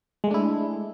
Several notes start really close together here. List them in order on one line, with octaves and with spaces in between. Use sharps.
G#3 A3 D4 E4